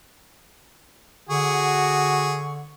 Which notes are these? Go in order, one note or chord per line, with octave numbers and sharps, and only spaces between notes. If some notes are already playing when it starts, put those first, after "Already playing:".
D3 F#4 G#4 C#6